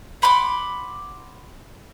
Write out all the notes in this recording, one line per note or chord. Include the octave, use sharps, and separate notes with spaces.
F#5 B5 C6 D6